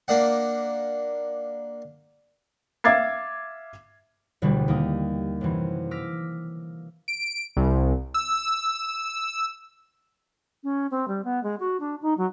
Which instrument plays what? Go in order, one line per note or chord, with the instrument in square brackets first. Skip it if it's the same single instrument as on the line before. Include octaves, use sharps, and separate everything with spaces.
[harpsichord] A#3 D4 F#5
[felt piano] E5 F5 D6 G#6 A6 C7
[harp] E1 D2 B2 D3 G3
D#2 A#3 D#6
F#2 C3 E3
D6 E6 F6 A#6 B6
[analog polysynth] D7
C2
E6
[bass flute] C#4
C4
G3
B3
G#3
F#4
D4
D#4
F#3